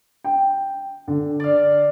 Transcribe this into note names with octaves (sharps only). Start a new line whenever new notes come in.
G5
D3
D5 F5